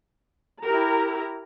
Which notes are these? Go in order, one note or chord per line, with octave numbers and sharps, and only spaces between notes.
E4 G4 A#4 A#5